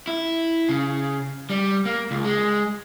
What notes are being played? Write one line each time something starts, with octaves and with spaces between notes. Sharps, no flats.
E4
C#3
G3
A#3
C#2
G#3